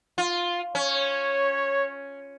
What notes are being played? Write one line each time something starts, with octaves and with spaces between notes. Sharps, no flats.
F4
C#4 C#5